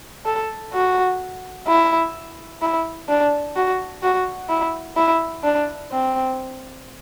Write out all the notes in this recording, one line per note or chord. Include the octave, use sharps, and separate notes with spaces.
A4
F#4
E4
E4
D4
F#4
F#4
E4
E4
D4
C4